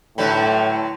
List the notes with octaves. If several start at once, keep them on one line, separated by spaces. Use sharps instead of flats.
A2 D3 F#3 B4 G5